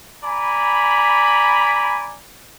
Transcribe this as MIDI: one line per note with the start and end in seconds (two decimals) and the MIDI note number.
0.24 2.17 74
0.24 2.17 80
0.24 2.17 82
0.24 2.17 83